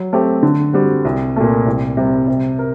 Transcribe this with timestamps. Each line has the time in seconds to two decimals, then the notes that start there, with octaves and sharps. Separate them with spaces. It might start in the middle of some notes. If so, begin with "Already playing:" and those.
Already playing: F#3
0.13 A3 C4 G4
0.43 D3
0.73 G3 C4 F#4
1.05 C2
1.36 A#2 A3
1.66 C2
1.97 C3 G3
2.28 C3
2.59 A#4